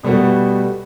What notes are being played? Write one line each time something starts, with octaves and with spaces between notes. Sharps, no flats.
B2 G3 A3 B3 F#4